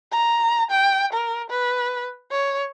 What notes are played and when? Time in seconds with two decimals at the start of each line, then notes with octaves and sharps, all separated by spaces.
0.12 A#5
0.71 G5
1.13 A#4
1.50 B4
2.31 C#5